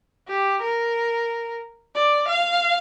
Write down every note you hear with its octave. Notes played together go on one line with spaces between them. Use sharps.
G4
A#4
D5
F5